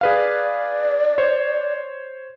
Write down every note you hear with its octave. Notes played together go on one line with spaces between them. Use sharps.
G#4 B4 D5 F5
C5 C#5